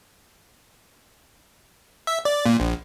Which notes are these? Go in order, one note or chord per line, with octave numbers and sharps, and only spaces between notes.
E5
D5
A#2
A#1